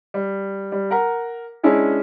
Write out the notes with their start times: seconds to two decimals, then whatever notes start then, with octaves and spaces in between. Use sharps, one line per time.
0.14 G3
0.72 G3
0.91 A#4 F#5 A#5
1.63 G#3 C#4 D4 E4 G#4